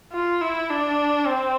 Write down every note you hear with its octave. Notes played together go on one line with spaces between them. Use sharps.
F4
E4
D4
C4